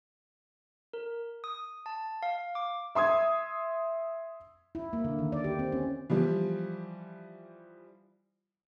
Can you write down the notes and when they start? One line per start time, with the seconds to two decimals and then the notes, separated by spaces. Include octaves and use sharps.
0.93 A#4
1.44 D#6
1.86 A5
2.23 F5
2.55 D6
2.95 E5 C6 D#6 G#6
4.75 E4
4.93 A#3
5.04 D3
5.19 D#3
5.32 D5
5.44 G4
5.59 C4
5.72 C#4
6.10 E3 F3 G3